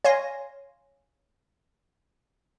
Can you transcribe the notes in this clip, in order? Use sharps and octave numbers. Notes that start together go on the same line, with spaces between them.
C#5 F5 G#5 C6 A#6